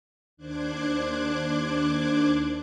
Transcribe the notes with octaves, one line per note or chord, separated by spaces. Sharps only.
D#2 D4 C5 D6 F#6 G#6